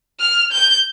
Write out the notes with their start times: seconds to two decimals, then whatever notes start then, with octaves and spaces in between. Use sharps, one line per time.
0.20 F6
0.52 G6